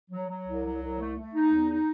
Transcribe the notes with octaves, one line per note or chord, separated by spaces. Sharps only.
F#3
F#3
C2
F#3
C2
A3
A3
D#4
E2
D#4